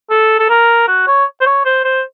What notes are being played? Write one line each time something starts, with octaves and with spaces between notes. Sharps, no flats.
A4
A4
A#4
F#4
C#5
C5
C#5
C5
C5